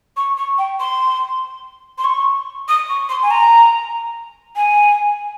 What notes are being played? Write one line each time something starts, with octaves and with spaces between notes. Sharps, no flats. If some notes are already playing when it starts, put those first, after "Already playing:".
C#6
C#6
G5
C6
C6
C#6
D#6
C#6
C6
G#5
A#5
G#5